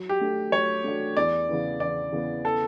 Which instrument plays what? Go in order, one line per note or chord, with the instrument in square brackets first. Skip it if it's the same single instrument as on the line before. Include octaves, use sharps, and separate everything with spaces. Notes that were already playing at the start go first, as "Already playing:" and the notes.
Already playing: [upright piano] F#3
[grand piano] G4
[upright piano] A3 D4 F#4
[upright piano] F#3 [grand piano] C#5
[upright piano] A3 D4 F#4
[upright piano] E2 [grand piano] D5
[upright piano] C#3 E3 B3
[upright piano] E2 [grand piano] D5
[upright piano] C#3 E3 B3
[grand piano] A4